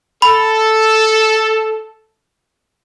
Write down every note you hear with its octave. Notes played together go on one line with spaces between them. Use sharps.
A4 B5